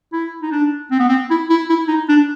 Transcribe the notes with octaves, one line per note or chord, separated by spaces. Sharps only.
E4
D#4
D4
C4
B3
C4
E4
E4
E4
D#4
D4